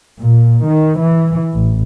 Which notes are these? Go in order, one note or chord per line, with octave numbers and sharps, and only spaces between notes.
A#2
D#3
E3
A1